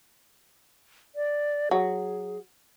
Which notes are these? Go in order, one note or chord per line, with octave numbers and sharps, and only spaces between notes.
D5
F#3 G#4